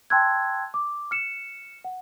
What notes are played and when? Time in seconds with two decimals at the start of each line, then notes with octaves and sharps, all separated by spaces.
0.10 G5 A5 C6 E6 F#6 G#6
0.74 D6
1.11 F6 C#7 E7
1.85 F#5